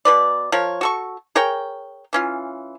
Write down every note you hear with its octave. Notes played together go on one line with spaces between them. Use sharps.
B2 B4 D5
F3 A#4 C#5
F#4 A4 C#6
G#4 A#4 C#5 G5
E3 C#4 F4